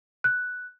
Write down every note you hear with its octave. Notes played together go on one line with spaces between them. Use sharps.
F#6